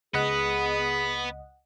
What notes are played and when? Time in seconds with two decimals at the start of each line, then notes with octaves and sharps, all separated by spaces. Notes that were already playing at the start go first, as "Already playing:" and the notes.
0.14 C#2 B3 G#4 D#5 F#5